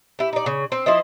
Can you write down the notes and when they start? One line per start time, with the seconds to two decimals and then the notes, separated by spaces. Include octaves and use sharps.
0.19 E4 G4
0.33 D#4 D5
0.46 C#3
0.72 C4
0.86 F3 E4 C5 D#5